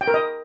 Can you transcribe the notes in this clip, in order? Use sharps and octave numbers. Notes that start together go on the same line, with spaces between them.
G5
A#4
D#5